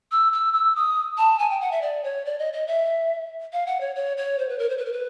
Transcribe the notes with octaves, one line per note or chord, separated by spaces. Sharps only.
E6
E6
E6
D#6
A5
G#5
G5
F#5
E5
D5
C#5
D5
D#5
D#5
E5
F5
F#5
C#5
C#5
C#5
C5
B4
A#4
C5
B4
A#4
B4